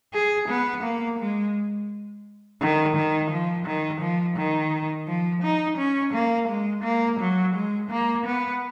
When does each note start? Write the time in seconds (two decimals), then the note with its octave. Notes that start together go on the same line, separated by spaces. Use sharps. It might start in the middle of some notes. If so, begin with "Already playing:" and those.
0.14 G#4
0.49 B3
0.83 A#3
1.20 G#3
2.61 D#3
2.96 D#3
3.32 F3
3.66 D#3
4.01 F3
4.37 D#3
5.08 F3
5.43 D#4
5.78 C#4
6.14 A#3
6.49 G#3
6.84 A#3
7.20 F#3
7.55 G#3
7.91 A#3
8.26 B3